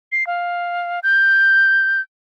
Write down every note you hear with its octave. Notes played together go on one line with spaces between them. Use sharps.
C7
F5
G6